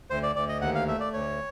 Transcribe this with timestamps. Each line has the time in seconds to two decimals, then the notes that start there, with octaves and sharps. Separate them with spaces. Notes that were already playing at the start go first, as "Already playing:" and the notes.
0.10 D2 C5
0.23 D5
0.35 D2 D5
0.49 D#5
0.61 D#2 F#5
0.75 F5
0.87 A3 E5
1.00 D5
1.13 D2 C#5